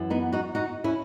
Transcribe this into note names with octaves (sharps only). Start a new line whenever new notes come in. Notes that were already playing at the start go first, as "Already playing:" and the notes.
Already playing: F#2 E3
B3 D#4
D#4 F#4
D#4 F#4
C#4 E4